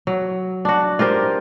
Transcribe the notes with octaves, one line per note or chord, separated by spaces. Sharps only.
F#3
D4 F#4
F4 G4 A#4 C5